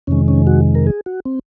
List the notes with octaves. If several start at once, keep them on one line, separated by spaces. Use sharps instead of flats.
F2 C3 D#3 G#3 C#4
C#4
F#4
A#4
G#4
F#4
C4